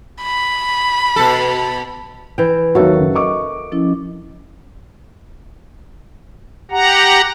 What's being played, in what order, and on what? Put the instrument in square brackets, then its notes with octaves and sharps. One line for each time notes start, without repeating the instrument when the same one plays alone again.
[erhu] B5
[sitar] B2 A4
[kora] E3 G5
[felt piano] D#2 F#3 [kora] F#4 A4 [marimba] A#4 E5 F5
[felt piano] F#1
D#5 C#6 D6
[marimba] F3 C#4 E4
[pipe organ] G4 F#5 A#5